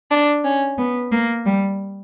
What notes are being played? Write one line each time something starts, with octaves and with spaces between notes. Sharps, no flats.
D4
C#4
B3
A#3
G3